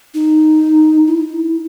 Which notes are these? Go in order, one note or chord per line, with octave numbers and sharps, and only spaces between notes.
D#4
E4